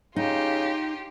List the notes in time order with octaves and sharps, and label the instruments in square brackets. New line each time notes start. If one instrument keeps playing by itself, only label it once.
[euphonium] C#3 [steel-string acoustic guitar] D#4 [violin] F4 G4